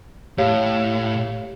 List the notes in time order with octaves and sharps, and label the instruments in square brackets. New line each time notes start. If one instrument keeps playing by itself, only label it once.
[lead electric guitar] A2 [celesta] G4 C#5 F5